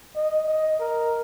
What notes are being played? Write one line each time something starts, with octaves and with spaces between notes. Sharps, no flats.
D#5
D#5
A#4